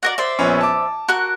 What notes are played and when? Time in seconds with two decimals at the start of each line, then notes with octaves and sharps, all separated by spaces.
0.03 F#4 A#4 D5
0.18 C5 D5 E5
0.39 A#1 B3 C#4
0.61 A5 D6
1.08 F#4 A#4 F#6